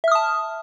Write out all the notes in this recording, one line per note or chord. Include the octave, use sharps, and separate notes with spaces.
E5 A5 D#6 F6